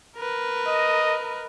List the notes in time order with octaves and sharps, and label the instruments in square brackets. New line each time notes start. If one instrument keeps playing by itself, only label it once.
[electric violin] A#4 B4
[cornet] D#5